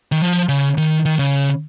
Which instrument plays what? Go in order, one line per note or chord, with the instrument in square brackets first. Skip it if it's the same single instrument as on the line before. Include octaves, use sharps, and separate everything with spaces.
[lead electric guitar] D#3
F3
C#3
D#3
D#3
C#3